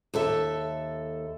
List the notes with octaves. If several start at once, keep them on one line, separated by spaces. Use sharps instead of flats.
D#2 A4 E5